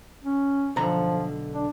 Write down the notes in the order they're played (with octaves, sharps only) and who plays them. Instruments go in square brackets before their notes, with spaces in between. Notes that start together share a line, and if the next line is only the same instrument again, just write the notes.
[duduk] C#4
[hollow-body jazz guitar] B1 D3 A#5 [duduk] F3
[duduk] D4